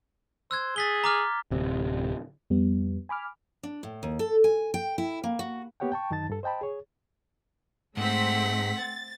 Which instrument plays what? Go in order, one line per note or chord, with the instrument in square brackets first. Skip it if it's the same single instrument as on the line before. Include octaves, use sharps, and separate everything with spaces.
[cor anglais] C5 [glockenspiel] E6 F#6 G#6
[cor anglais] G#4 [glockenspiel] A6 B6 G7
[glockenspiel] A#5 D6 F6
[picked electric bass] D1 C3
[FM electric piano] F2 G3 B3
G#5 B5 D6 F6
[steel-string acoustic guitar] D4
A2
D#2
A4
G#5
G5
E4
A#3
F#4
[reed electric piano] A#3 B3 G4 C#5 F#5 G5
G5 A5 C#6
F#2 D#3 D#4 A5 A6
G2 A4
C5 D#5 G5 A5 B5
G#4 C#5
[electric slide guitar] G#2 [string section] A3 C4 B6 [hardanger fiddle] F#5
[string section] A6